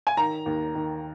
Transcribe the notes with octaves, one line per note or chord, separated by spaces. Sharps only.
G#5
D#3 A#5
D#2
D#3